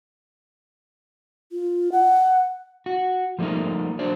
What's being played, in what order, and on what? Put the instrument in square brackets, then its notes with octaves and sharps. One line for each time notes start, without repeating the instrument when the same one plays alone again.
[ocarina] F4
F#5
[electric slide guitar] F#4
F3 G3 A3 A#3 D#4
F#3 D4 C5 D5